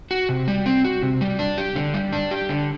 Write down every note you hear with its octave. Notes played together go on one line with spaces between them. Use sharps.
F#4
C3
G3
C4
F#4
C3
G3
D4
G4
D3
G3
D4
G4
D3